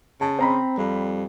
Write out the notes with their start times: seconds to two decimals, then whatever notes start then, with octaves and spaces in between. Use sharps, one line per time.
0.21 C#3 A5
0.39 C4 C5 A#5 B5
0.78 F2 G3